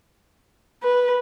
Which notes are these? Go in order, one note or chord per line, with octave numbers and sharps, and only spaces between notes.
B4